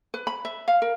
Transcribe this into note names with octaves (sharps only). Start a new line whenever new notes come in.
B4
B5
E5
F5
A#4